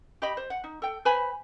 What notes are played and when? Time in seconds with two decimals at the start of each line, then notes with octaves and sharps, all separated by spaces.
0.22 G4 D#5 B5
0.37 C5
0.50 F#5
0.64 D#4
0.82 A4 G5
1.05 B4 C5 G#5 B5